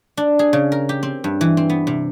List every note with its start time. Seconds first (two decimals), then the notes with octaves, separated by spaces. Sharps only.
0.17 D4
0.39 G#4
0.53 C#3
0.72 A#4
0.89 G4
1.03 C4
1.24 G2
1.41 E3
1.57 C4
1.70 B3
1.87 C3